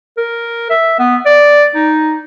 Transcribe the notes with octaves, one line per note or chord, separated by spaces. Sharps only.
A#4
E5
B3
D5
D#4